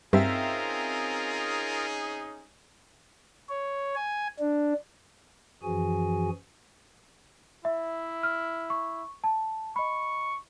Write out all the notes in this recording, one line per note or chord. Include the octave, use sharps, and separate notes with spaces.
G2 C4 C#4 D#4 F4 G#4 A#4 E5
C#5
G#5
D4
F#2 E3 F3 F#4 G#4 G#5
E4 E5
F6
C#6
A5
D#5 B5 C#6